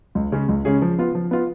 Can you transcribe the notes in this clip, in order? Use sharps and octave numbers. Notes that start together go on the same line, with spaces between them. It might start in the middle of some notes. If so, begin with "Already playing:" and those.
C#2
C#3 G#3 C#4 G#4
C#2
C#3 G#3 C#4 G#4
F3
B3 F4
F3
B3 F4